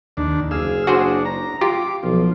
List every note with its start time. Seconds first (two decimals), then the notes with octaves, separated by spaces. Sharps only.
0.17 D#2 D4
0.51 F#1 G#4 F5 E6
0.87 D4 F#4 G#4 C5
1.25 A#5
1.61 F4 G4 D6
2.03 B1 F3